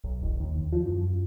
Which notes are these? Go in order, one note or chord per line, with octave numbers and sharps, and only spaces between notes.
B1
E1
D#2
F3
F#2